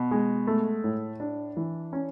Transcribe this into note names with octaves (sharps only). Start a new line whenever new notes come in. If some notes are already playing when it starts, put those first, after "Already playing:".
Already playing: B2
G#3
A3
A2
D4
E3
C#4